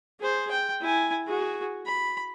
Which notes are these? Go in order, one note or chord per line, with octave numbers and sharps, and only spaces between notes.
G#4 C5
G5
E4 G#5
F#4 G#4
B5